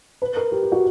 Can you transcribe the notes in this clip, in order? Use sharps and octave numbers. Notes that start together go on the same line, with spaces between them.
B4
A#4
G4
G4
F#4